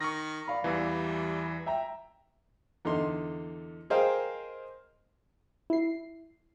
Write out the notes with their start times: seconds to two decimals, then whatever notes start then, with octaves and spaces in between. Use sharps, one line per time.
0.01 D#3 C#6 A#6
0.48 D5 F5 B5
0.64 E2 E3 G3
1.66 E5 G5 A#5
2.85 E2 D3 D#4 C6
3.90 G#4 A#4 C5 D#5 F5 G5
5.70 E4 C7